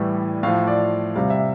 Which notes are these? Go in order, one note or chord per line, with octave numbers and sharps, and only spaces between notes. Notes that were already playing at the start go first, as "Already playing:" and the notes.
Already playing: A2 E3 G3
A2 F3 F5
D5
C3 G3 F5
E5